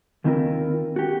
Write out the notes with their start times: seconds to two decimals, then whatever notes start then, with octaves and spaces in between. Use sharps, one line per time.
0.24 D#2 D#3 C4 E4 F4 A#4
0.96 F#4 G4